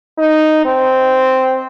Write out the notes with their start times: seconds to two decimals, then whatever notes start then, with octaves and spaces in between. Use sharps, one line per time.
0.18 D#4
0.65 C4